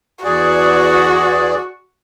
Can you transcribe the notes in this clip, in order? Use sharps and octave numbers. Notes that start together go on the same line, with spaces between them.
E2 F#4 G#4 D5